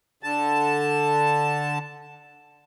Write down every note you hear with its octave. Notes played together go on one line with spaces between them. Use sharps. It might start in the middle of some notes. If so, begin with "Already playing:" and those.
D3 A5